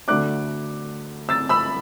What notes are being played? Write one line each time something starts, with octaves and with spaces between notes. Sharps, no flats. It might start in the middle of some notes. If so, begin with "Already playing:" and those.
D2 D3 A3 D4 D6 F#6
E6 A6
B5 E6